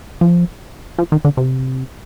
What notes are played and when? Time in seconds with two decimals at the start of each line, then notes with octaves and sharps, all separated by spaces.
0.21 F3
0.98 F3
1.12 D#3
1.25 D3
1.37 C3